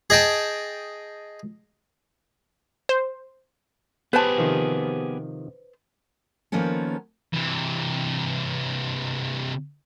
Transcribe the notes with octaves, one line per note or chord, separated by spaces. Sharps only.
G#4 D#5 G5 A5
C5
B3 G4 G#4 B4 C5 A5
C3 D#3 F3
D#3 F3 A#3 B3 C#4 A4
C3 E3